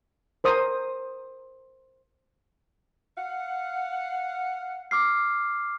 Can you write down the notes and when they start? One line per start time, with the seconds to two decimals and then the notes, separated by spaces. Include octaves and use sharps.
0.44 A#4 C5 D#6
3.17 F5 F#5
4.91 D6 F6 C7